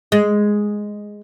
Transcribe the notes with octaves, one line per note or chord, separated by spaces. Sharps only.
G#3